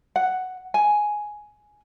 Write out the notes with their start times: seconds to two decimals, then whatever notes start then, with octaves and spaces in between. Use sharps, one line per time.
0.16 F#5
0.74 G#5